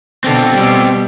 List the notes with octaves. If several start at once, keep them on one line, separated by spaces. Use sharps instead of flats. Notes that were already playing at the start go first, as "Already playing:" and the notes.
B2 D3 C4 A4
B2 G3